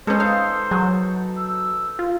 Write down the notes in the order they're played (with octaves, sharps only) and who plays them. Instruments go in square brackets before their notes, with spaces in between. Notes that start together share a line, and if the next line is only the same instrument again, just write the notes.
[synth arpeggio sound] G#3 C#4 [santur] A4 B4 D#6 [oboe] C5
[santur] D#4 [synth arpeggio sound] F5
[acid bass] F#3 [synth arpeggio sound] G#4
[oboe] E6
[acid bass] F4